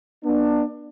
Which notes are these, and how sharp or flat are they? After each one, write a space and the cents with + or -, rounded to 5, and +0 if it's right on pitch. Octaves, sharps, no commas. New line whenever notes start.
B3 -35 D4 +20